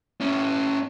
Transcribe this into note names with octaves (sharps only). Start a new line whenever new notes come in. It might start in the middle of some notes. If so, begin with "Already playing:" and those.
C#4 E4